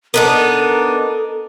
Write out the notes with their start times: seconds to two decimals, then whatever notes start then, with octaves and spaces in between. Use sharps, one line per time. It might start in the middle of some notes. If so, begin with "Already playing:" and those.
0.14 B3 D4 D#4 A4 A#4